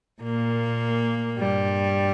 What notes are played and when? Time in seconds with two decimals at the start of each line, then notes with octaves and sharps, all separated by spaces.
0.22 A#2 A#3
1.39 G2 G3